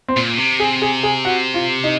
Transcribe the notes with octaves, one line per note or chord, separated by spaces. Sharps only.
C4
A#2
C3
G#4
G#4
G#4
F#4
F4
D#4